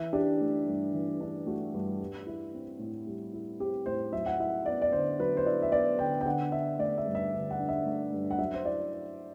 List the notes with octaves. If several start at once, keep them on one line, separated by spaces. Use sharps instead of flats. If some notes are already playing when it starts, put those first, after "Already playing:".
Already playing: E3 E5
D4 G4
A3
G2
E3
D4
A3 F#4
G2
G3
E4
C4
A2
G3
E4
C4 G4
A2 C5
F#3 E5
F#5
E4 E5
B3 D5
D5
D3 C5
F#3 B4
C5
E4 D5
E5
B3 D5
D3 G5
G5
D3 F#5
D4 E5
A3 D5
E5
G2
E5
D3
F#5
D4
E5
A3
G2
F#5
F#3 E5
C5
E4 D5